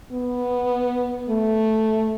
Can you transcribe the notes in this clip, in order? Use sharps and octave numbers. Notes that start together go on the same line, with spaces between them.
B3
A3